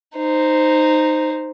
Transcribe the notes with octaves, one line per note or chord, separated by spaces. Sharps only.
D#4 C5